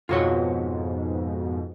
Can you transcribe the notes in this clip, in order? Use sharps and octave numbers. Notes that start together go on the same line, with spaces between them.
F2 G#2 B2 F4 F#4 C#5